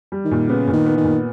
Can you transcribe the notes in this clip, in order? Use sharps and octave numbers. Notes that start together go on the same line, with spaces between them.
G3
D#3
A#2
C#3 B3
A#2
D#3
B3
D#3
A#2